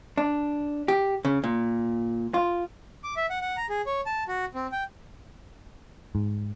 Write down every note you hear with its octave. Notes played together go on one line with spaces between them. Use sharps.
D4
G4
C#3
A#2
F4
D6
E5
F#5
F#5
A#5
G#4
C#5
A5
F#4
C4
G5
G#2